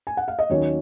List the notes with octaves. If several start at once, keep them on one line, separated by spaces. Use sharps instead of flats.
G#5
F#5
F5
D#5
D#2 D#3 F#3 A#3 C#4 C#5